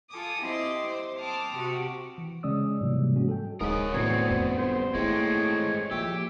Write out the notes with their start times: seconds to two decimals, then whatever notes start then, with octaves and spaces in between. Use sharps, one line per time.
0.11 F4 A4 G#5 D6 D#6
0.42 C4 E4 G4 D#5 C6 D6
0.88 C5
1.19 G5 A5 C6 D6 D#6 F6
1.58 C3 F#4 G4
2.18 E3
2.43 C#3 G#3 C#4 D5 D#6 E6
2.81 G#2 C3 E3 F#3 G3 A#3
3.16 G#3 C#4 F#4
3.29 A4 G5
3.61 D1 G#2 D#4 A#4 C#5 D#6
3.94 D2 A2 F#3 B3 C4 C#5
4.30 F2
4.58 G1 C5
4.94 A2 G#3 A#3 C4 C#5
5.91 A#2 F3 G4 E5